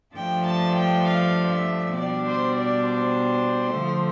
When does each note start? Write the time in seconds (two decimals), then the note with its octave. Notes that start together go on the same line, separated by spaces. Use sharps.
0.15 G2 F3 A3 D4 G5
0.46 A5
0.76 G5
1.07 F5
1.52 E5
1.97 B2 G3 D4 D5
2.28 C5
2.58 D5
2.88 C5
3.78 D3 F3 A3